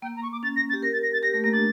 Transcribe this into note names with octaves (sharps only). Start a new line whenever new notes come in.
A#3 G5
A#5
C#6
D6
C#4 A6
A#6
A6
G4
A#4 A#6
A6
A#6
A6
G4 A#6
A3 A#6
A#3 A#6
D4 A6